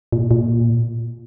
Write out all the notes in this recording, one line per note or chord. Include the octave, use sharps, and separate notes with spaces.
A#2
A#2